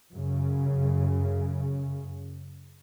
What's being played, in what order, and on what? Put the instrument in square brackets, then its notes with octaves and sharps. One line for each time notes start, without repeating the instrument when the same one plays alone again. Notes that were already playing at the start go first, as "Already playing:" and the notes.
[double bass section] F#2 C#3